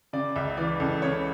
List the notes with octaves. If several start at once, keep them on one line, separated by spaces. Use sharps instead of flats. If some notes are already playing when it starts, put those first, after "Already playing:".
C#3 D5
C#2 E5
E3 D5
C#2 A4
C#3 C#5